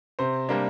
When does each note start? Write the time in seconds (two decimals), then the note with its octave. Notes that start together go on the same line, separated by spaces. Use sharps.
0.19 C3 C5
0.49 G3 A#3 D4